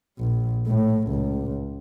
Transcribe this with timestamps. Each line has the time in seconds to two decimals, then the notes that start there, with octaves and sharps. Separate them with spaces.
0.19 A#1
0.67 A2
1.08 C#2